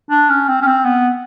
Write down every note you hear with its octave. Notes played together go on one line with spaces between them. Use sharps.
D4
C#4
C4
C#4
C4
B3